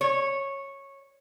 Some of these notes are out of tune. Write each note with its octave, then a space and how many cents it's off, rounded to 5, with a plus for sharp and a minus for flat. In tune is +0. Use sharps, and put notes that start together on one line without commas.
C#5 -10